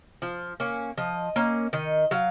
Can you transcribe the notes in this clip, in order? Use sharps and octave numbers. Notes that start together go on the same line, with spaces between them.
F3
A#3 C#4
F3 D#5
A#3 C#4
D#3 D#5
F#3 F5